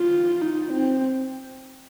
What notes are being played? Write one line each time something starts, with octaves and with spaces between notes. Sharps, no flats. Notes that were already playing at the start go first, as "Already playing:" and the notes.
Already playing: F4
D#4
C4